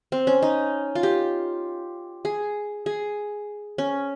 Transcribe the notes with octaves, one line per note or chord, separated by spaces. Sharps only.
C4
C#4
D#4
F4
G4
G#4
G#4
C#4